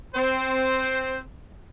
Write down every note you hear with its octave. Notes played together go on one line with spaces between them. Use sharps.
C4 C5